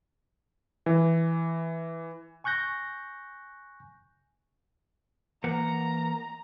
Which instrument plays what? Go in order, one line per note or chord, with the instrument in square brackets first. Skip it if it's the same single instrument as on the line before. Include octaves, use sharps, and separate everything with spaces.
[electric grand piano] E3
[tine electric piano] G#5 C#6 F#6 G6 A#6
[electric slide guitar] E3 A#3 F#5 [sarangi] A#5